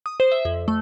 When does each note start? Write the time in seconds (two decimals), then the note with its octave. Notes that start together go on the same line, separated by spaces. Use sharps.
0.06 D#6
0.20 C5
0.32 E5
0.45 F2
0.68 A3